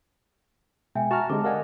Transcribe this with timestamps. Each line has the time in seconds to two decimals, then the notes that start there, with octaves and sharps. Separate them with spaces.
0.95 B2 G#3 E5 G5 G#5
1.11 F#4 A5 A#5 C#6 F6
1.30 D3 G#3 C4 G4 A5 D6
1.44 A#4 D5 D#5 F5 F#5 G#5